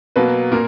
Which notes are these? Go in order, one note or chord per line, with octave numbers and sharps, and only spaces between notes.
B2 F#3 A#3 B4
A#2 A#3 A#4